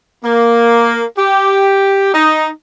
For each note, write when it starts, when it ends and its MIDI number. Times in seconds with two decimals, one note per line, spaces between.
0.24 1.05 58
1.18 2.13 67
2.14 2.48 63